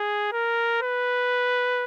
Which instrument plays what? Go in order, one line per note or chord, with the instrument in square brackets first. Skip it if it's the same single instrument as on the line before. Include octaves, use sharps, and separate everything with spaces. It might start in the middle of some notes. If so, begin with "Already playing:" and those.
Already playing: [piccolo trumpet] G#4
A#4
B4